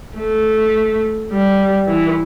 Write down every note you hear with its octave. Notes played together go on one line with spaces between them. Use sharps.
A3
G3
E3